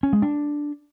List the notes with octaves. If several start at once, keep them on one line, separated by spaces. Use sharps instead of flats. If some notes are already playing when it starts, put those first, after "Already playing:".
C#4
G#3
D4